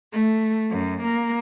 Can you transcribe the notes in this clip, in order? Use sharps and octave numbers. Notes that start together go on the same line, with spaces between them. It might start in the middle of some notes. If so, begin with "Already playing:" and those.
A3
F#2
A#3